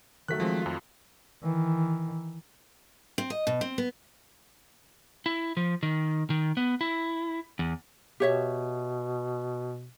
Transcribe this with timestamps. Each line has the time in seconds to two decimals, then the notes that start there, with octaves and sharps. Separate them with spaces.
0.28 D#3 F#3 A3 F#6 B6
0.40 F3 G#3 C4
0.62 F2 F4
1.43 D#3 E3
3.18 C4
3.30 D#5
3.47 B2
3.61 C4
3.78 B3
5.26 E4
5.57 F3
5.83 D#3
6.30 D#3
6.57 B3
6.81 E4
7.59 E2
8.20 B2 G4 C#5 E5